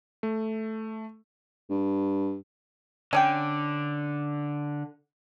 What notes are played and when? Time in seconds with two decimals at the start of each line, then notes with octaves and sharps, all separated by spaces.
0.23 A3
1.70 G2
3.13 D3 C#4 D5 G5